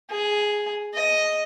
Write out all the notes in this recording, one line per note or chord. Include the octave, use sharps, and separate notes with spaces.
G#4
D#5